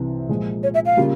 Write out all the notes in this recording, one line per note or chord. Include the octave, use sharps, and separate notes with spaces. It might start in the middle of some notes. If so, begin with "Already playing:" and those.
Already playing: C2 C3 E3
A#2 F3 G#3
C#5
E5
F5
C#3 G3 A#3 F4